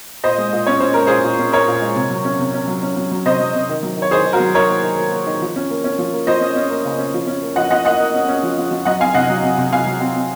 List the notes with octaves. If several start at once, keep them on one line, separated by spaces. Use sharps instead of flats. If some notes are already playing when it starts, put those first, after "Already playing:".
A#2 C5 D#5
G#3
A#2
C#4 C#5
C#4 C5
G#3 A#4
A#2 G#4 C5
A#2
C#4
A#2 A#4 C#5
A#2
G#3
C3
F#3
C#4
C3
C#4
F#3
C#4
F#3
F#3
C3 C5 D#5
F#3
C3
D#3
F#3
D#3 C#5
D#3 G#4 C5
D#3
F#4 A#4
F#3
D#3 A#4 C#5
A#3
D#3
A#3
A#3
D#3
F3
C#4
A#3
C#4
F3
A#3
F3 C5 D#5
C#4
C#4
A#3
C#3
C#4
F3
C#4
A#3
F3 D#5 F#5
F3 D#5 F#5
A#3 D#5 F#5
A#3
C#4
C#4
F3
F3
F3
F#3 D#5 F#5
C4 F5 G#5
C3 D#5 F#5
F#3
C3
C3
C3 F5 G#5
F#3
C4
C4